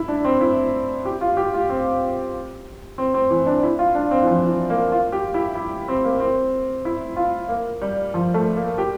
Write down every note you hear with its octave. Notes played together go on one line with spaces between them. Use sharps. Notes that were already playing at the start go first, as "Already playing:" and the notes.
Already playing: E4
D4
C4
E4
G4
F4
G4
F4
C4
C4
C4
E3
D4
E4
F4
D4
C4
E3
F3
E3
A#3
F4
G4
E4
E4
C4
A#3
C4
E4
F4
A#3
G3
F3
A3
A#3
G4